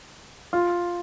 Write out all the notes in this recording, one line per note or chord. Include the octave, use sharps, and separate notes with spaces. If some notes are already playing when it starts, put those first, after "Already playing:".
F4